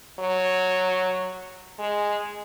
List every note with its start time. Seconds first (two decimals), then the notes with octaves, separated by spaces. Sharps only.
0.19 F#3
1.79 G#3